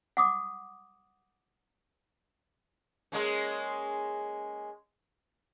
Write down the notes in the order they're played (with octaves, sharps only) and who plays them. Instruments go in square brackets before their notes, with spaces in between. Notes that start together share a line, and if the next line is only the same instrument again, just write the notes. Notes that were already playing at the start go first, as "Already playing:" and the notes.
[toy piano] F#5 D6 D#6
[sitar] G#3 A#3 C#4